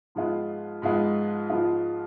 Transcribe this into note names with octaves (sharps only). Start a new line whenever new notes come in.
G#2 F3 G#3 B3 F4
G#2 F3 G#3 B3 F4
G#2 F3 G#3 B3 F4